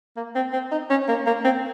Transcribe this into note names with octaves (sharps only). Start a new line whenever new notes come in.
A#3
C4
C4
D#4
C#4
A#3
A#3
C4